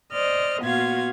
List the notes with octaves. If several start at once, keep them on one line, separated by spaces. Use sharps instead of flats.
C5 D5 D#5 F6
A#2 B3 F4 F#4 F5 G#6